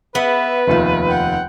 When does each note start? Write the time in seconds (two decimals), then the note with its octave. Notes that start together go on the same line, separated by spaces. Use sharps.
0.15 B3 B4 E5
0.67 F1 D#2 A3 F4
1.08 F#5 G5